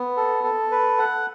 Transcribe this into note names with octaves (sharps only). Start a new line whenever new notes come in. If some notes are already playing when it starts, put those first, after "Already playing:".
Already playing: B3
A4
A4
B4
F#5